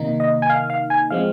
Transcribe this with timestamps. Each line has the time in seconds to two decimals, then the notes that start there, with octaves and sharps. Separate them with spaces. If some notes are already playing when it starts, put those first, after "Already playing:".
Already playing: C3 D#3 A#3 D#4
0.20 D#5
0.42 G#5
0.50 F5
0.70 F5
0.90 G#5
1.10 F3 G#3 C4 F5